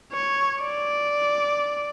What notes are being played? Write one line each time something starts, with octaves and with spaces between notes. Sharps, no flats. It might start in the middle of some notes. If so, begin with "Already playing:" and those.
C#5
D5